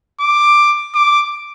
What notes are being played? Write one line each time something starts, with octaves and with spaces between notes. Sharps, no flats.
D6
D6